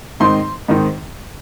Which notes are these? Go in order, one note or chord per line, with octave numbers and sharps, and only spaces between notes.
G#2 D#3 C4 D#4 C6
G#2 D#3 C4 D#4